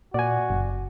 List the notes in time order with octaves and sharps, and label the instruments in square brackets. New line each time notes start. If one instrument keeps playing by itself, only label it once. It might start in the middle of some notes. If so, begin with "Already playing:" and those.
[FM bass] A#2 [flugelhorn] F#4 [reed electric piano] D5 G#5
[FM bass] F#1